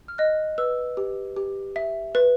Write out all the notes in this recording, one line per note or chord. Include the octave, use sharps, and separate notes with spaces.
F6
D#5 F#6
B4 E6
G4
G4
E5
B4